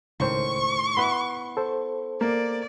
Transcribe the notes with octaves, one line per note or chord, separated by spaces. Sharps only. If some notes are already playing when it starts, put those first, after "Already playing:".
C#2 A2 D#3 C5 C6 C#6
B3 E4 B4 B5
A4 C5
A#3 D5